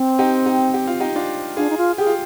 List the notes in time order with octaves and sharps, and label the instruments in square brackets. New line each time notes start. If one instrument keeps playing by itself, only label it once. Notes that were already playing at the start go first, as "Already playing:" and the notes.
Already playing: [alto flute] C4
[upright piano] D#4 G4
D#4 G4
G4
F4
D#4 G4
D4 F4
[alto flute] D4 [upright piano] F4 G#4
[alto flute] D#4
F4
[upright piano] G4 [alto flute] G#4
[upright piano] F4